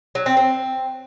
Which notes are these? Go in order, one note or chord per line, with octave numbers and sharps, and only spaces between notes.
F#3
C4
C4